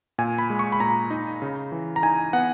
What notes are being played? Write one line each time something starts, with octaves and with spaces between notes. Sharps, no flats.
A#2 G#5
B5
G#3
C#6
B5
A#2 A#5
D#4
C#3
E3
A#5
D#4 G#5
B3 F#5